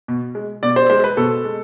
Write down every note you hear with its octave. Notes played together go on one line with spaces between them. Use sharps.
B2
G#3
B2 D5
C5
G#3 C5
B4
B2 A4
G#3